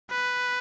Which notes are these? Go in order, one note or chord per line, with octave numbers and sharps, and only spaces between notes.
B4